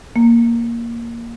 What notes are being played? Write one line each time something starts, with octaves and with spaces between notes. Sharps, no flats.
A#3